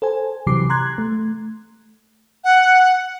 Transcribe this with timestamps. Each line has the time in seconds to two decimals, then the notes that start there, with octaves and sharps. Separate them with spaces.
0.02 A4 C5 G#5
0.47 C3 E3 F#3 G4 D6 C7
0.70 A#5 C6 F#6 G#6
0.98 A3
2.44 F#5